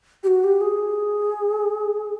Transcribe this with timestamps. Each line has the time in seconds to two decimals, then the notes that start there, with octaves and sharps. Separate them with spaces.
0.24 G4
0.27 F#4
0.44 G4
0.61 G#4